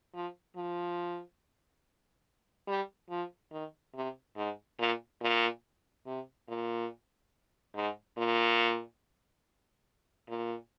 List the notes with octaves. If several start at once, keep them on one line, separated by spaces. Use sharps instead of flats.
F3
F3
G3
F3
D#3
C3
G#2
A#2
A#2
C3
A#2
G#2
A#2
A#2